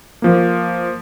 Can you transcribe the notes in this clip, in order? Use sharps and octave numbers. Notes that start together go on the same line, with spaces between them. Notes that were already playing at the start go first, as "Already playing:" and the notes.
F3 A#3